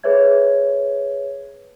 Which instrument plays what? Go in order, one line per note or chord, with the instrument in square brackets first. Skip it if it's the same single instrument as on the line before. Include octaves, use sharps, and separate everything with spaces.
[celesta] G#4 B4 C#5 E5 G#6